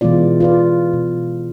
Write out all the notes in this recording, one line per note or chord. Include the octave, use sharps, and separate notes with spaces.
B2 E3 G#3 B3 F4 D5
F4 B4 D5
B2